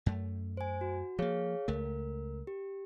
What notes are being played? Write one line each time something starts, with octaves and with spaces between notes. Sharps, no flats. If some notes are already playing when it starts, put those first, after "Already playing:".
F#2 A3
C5 G#5
F#4
F3 A#3 G#4 C#5 F5
C#2 A3 A#4
G4